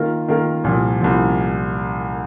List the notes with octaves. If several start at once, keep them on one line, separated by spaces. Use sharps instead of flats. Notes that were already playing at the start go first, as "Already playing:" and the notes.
Already playing: D#3 A#3 F4 A#4
D#3 A#3 F4 A#4
C2 A#2 F3
C2 A#2 F3